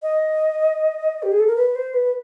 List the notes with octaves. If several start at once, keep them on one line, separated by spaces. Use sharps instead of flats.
D#5
G4
G#4
A4
A#4
B4
C5
B4